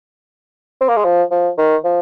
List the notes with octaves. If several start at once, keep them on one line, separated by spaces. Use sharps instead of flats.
C4
A#3
G#3
F3
F3
D#3
F3